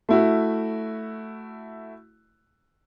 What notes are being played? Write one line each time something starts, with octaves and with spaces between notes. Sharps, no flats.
A3 E4 F#4